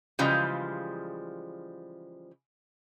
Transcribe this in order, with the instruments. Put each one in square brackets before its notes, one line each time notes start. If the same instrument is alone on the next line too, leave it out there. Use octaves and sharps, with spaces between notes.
[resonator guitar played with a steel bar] C#3 E3 F3 G3 G#3